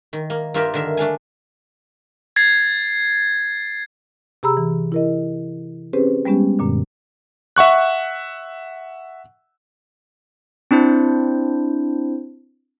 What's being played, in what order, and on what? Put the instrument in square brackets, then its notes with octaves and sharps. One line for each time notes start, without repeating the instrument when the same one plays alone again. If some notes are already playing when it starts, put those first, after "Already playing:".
[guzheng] D#3
A#3
G2 A#3 F4 G4 A#4 E5
D3 D#3 A#4 E5
A3 D4 F5 G#5
[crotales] G#6 A6 C7
[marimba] C3 G4 G#4 A#5 B5 E6
E3
E4 A#4 D#5
C4 C#4 G4 G#4 B4 C5
G3 G#3 B3 C#4 G4
F#2 A#2 D3
[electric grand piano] E5 F#5 C#6 F#6
[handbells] C4 D4 E4 C5